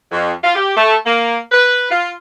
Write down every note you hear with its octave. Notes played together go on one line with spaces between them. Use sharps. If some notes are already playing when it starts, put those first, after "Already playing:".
F2
F4
G4
A3
A#3
B4
F4